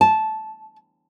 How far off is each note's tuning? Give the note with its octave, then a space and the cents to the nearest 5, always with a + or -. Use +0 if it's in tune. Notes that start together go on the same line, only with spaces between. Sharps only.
A5 -10